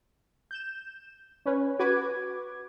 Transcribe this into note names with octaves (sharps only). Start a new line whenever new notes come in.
G6 E7
C#4 B4 C#5
F#4 B4 D6 G#6